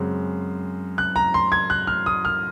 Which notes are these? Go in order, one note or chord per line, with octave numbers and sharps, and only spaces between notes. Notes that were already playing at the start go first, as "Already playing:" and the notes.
Already playing: F#2 C#3 G#3 C4
F#6
A#5
C6
G#6
F#6
F6
D#6
F6